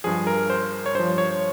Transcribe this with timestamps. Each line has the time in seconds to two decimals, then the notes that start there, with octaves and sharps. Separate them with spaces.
0.04 G2 F3 G#4
0.27 A#4
0.50 C5
0.86 C#5
0.95 G2 F3 C5
1.18 C#5